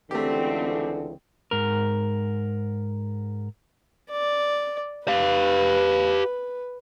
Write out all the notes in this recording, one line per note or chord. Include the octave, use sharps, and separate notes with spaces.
C#2 D3 E3 A3 C4 G4
G#2 A#4
D5
G4 B4 F5